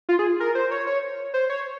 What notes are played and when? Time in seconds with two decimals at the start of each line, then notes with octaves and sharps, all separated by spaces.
0.09 F4
0.19 G#4
0.40 A#4
0.55 C5
0.71 C#5
0.87 C#5
1.34 C5
1.50 C#5